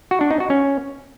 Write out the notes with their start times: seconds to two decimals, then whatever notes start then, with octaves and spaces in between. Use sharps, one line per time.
0.11 F#4
0.21 D4
0.31 D#4
0.40 F#4
0.50 C#4